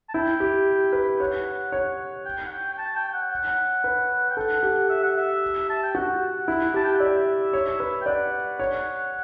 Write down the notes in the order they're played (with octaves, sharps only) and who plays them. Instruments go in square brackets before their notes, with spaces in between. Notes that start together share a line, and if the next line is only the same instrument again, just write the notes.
[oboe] A5
[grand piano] E4 [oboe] G5
[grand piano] G4
B4
[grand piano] C#5 [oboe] F#5
[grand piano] C#5
[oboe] G5
F#5
G5
G5
A5
G5
G5
F#5
F#5
[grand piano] B4
[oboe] G5
[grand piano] A4 [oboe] F#5
[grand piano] G4
[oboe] E5
F#5
E5
A5
G5
[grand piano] F#4 [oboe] F#5
[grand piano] E4
[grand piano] G4 [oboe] A5
[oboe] G5
F#5
[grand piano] D5 [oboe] E5
[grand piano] C#5
B4
[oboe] G5
[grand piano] D5 [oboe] F#5
[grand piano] C#5